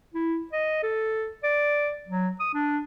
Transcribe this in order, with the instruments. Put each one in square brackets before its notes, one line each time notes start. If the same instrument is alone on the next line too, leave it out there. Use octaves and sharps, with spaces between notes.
[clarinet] E4
D#5
A4
D5
F#3
D#6
D4